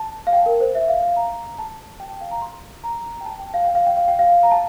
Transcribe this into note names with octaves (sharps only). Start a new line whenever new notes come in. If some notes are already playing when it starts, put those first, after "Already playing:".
Already playing: A5
F5
G5
A#4
C5
E5
F5
F5
A#5
A5
G5
G5
F5
A#5
C6
A#5
G5
A5
G5
F5
G5
F5
G5
F5
G5
F5
A#5
A5